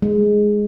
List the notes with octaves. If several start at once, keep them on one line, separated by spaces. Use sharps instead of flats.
G#3